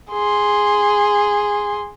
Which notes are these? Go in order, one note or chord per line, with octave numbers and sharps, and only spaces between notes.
G#4 C6